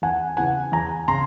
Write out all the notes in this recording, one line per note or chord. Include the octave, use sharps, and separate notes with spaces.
E2 F#5 G#5
C#3 E3 F#5 G#5
E2 G#5 A#5
C#3 A#5 C6